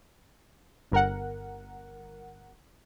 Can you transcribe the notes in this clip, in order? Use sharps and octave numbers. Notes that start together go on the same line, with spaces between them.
G1 A#4 F#5